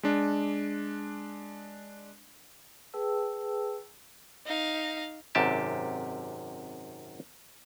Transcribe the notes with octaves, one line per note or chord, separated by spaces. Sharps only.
G#3 D4
G#4 B4 G5 A5 E6
D#4 F5
G#1 F#2 C3 G4 A5